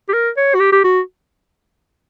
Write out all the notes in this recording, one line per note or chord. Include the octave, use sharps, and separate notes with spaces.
G4
A#4
C#5
F#4
G4
G4
F#4